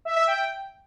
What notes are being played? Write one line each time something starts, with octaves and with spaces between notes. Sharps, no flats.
E5
E5
G5